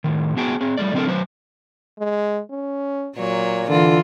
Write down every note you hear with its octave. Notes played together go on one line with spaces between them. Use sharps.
A2 D#3
B3 F#4 G#4 G5 A5
C4 G#4
G3 A3 A#3 D5
D3 F#3 C4 D4 A4 A#4
F#3 B4 C5
G#3
C#4
A#2 F#3 C#5
D3 E3 F4